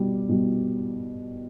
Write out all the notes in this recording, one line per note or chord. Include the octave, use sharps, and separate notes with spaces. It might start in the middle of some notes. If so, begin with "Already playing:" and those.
Already playing: B2 G3
B2 G3